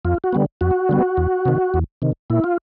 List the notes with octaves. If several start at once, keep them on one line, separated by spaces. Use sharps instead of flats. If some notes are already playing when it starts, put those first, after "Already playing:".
F2 F4
F#4
D3 G3 B3
F2 F#4
D3 G3 B3
E2
C3 D#3
E2
C3 D#3
A#2 E4
F4